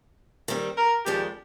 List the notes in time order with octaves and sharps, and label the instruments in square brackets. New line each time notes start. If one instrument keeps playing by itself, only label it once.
[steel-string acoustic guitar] D#3 G3 C4
[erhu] A#4
[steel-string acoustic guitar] F2 D#3 G#3 D4 [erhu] G4